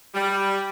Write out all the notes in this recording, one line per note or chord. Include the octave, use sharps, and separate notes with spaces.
G3